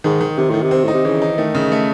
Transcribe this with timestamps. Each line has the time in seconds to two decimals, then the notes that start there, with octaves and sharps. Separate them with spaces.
0.04 G#2 D#3
0.21 D#3
0.37 C3 D#3
0.50 A2 D#3
0.62 C3
0.71 C4
0.84 A2 D#4
0.94 C3
1.05 C#3 E3
1.22 D#4
1.38 D#3 A3
1.55 C#3
1.72 A3